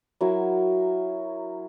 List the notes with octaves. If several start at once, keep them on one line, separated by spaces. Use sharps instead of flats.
F#3 E4 A#4